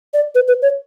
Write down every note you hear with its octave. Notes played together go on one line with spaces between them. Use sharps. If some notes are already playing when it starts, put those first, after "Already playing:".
D5
B4
B4
C#5